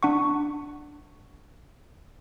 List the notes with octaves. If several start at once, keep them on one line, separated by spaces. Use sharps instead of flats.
D4 F#5 C#6